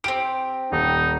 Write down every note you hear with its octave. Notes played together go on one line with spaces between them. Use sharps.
C4 G4 D7
D#1 D#4